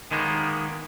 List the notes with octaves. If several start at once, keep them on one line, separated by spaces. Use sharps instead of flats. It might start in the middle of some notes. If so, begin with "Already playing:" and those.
D#3 G#3 A#3 B3